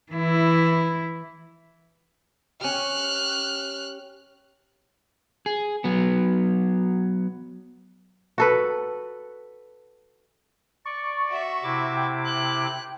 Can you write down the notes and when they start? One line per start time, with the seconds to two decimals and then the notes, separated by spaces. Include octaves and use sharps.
0.12 E3 E4
2.61 C#4 G4 F6 F#6
5.46 G#4
5.84 F#3 B3
8.38 F#4 A4 B4
10.85 D5 C#6
11.29 F#4 E5
11.63 C3 E4 D6
11.97 G5
12.25 F#6